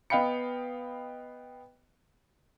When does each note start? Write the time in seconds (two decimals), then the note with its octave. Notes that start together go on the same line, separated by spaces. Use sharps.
0.10 B3 D#5 F5 G5 B5 C#7